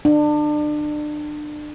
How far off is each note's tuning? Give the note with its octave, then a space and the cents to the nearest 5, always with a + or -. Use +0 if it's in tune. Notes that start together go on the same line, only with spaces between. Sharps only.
D4 +30